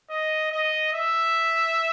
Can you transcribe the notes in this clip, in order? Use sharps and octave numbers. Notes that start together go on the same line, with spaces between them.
D#5
D#5
E5